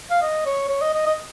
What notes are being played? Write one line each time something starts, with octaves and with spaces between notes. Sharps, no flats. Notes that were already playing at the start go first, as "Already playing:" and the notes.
F5
D#5
C#5
C#5
D#5
D#5
D#5